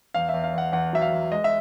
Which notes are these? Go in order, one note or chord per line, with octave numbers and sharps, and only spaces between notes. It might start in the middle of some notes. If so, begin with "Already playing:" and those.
E2 F5
E2 E5
F5
E2 F#5
E2 F#5
F#3 E5
F5
E2
G#3 D#5
E5